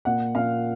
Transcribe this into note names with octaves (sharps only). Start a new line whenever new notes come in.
A#2 F#5
A#2 F5